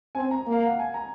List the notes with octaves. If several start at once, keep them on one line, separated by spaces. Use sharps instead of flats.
C4 G#5
A#5
A#3
F5
F#5
G#5
A#5